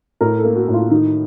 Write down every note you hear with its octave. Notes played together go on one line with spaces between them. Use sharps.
A2 A#4
A4
A#3
F#4
A2
F4
D#3 D#4